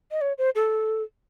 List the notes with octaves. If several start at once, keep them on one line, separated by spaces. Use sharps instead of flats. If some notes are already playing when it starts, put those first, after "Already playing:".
D#5
C#5
C5
A4